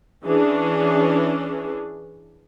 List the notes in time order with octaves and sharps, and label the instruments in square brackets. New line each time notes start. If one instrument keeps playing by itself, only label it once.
[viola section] E3 C#4 D4 G#4